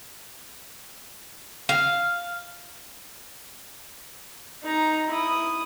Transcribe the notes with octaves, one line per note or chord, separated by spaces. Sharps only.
F5
D#4 A#5
E4 D#6